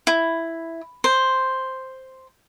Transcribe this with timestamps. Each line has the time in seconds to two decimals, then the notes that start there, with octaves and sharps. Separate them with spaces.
0.07 E4
1.04 C5